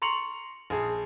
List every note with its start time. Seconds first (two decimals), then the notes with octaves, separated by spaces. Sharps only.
0.02 A#5 C6 C#6 C#7 F7 F#7
0.70 A#1 G#4 A5